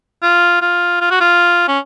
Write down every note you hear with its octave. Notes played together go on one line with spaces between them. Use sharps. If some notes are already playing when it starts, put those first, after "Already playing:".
F4
F4
F4
F#4
F4
C#4